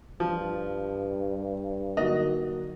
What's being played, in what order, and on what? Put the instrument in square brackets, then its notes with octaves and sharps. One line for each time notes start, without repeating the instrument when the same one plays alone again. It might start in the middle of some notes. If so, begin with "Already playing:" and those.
[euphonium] G2 [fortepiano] F3
[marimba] D3 F#3 D#4 [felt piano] A#3 F#4 [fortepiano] D#5